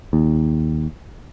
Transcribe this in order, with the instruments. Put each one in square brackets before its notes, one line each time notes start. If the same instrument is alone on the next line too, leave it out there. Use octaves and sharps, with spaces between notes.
[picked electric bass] D#2